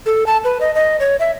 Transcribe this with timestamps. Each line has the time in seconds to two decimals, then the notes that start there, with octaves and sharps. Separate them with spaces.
0.06 A4
0.26 A5
0.44 B4
0.61 D#5
0.75 D#5
1.00 C#5
1.20 E5